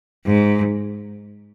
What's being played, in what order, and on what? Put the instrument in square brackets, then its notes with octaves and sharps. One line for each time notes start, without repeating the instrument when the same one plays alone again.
[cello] G#2